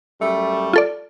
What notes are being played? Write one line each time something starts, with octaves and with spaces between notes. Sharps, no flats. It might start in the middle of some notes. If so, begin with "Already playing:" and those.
F#2 G3 A3
F4 A4 D5